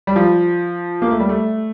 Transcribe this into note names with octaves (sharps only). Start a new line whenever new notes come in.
G3
F3
A#3
A3
G3
A3